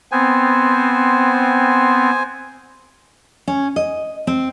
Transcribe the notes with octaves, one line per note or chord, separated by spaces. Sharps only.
B3 C4 C5 G#5
C#4
D#5
C4